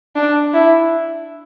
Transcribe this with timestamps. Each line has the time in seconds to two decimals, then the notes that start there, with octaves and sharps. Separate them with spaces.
0.16 D4
0.53 E4